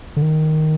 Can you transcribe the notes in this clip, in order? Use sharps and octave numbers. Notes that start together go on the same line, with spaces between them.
D3
D#3